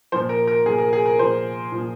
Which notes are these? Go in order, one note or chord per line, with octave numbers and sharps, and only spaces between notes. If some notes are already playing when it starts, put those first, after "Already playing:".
A#2 F3 C5
A#4
A#4
A#2 F3 G#4
A#4
G#4
A#4
A#2 F3 C5
A#2 F3